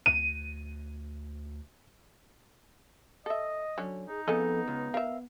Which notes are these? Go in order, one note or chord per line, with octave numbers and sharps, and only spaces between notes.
D2 D#7
A4 D#5 E5
D3 F#3 C#4
D#4 G#4
F2 C#3 B3 A4 D#5 G#5
C#2
A#4 E5 F5